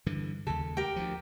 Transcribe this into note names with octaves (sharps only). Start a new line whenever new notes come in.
G2 D3 E3
D#2 C#3 A4
G4 A#4 G5
D2 F3